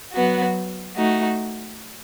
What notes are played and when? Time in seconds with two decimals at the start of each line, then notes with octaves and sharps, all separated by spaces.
0.13 F#3 B3 F#4
0.95 A3 D#4 F#4